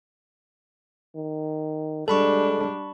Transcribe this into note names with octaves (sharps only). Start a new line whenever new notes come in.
D#3
G3 G#3 D4 A4 A5 B5 C#6